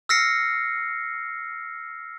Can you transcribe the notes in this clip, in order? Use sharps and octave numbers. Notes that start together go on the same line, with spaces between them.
E6 F6 A#6 C7 C#7